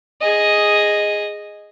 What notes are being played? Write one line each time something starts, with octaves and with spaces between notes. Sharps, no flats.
G#4 D#5